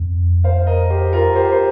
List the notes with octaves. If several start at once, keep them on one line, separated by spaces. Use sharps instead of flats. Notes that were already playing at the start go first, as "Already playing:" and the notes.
Already playing: F2
C5 F5
A#4 D#5
G4 C5
F4 A#4
G4 C5
C5